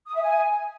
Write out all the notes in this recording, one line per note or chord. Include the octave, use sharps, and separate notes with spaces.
D#6
E5
G#5